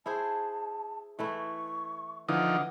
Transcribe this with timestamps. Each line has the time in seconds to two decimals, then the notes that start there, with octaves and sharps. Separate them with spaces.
0.06 E4 G#4 C5 A5
1.19 E3 A3 E4 C#6
2.28 D3 E3 F3 D#4 F#5